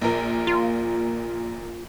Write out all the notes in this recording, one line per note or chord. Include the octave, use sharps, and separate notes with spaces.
A#1 A#2 A#4
F4